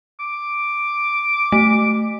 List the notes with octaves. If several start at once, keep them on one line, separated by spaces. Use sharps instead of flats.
D6
A3